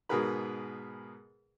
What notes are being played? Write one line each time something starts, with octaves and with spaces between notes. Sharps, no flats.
G#2 B2 G#4 A#4 B4 B5